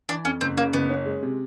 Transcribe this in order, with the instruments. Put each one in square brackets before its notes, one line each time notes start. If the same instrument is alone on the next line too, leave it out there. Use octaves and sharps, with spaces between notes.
[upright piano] E3 [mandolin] D4
[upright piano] F2 [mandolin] C#4
[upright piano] F#1 [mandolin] C4
[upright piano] C#3 [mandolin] A#3
[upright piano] F#1 [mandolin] B3
[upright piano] C#4
G#3
C3